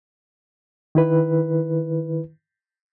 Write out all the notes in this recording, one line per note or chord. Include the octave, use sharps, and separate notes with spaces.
D#3 E4 B4